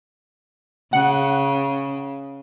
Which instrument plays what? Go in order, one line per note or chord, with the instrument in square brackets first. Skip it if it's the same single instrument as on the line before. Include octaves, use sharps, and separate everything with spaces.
[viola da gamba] C#3 [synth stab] F#5